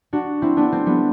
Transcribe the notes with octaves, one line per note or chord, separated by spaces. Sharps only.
D4 F#4
C4 E4
B3 D4
A3 C4
G3 B3